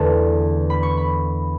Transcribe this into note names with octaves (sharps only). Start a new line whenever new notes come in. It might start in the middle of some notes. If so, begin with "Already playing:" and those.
Already playing: E2 D3 A3 E4 A5
B5
C#6
B5